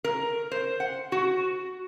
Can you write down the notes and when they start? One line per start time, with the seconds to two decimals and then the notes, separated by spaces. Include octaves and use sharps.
0.04 A#4
0.52 C5
0.80 F#5
1.12 F#4